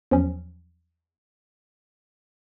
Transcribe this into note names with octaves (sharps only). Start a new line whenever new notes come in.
E2 F3 F#3 C#4